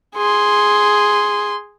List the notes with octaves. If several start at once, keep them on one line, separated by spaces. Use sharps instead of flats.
G#4 C6